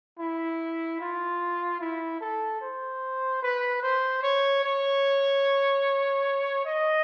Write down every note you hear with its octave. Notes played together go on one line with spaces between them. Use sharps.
E4
F4
E4
A4
C5
B4
C5
C#5
C#5
D#5